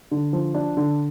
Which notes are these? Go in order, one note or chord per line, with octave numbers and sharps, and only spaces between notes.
D3
F3
D4
D3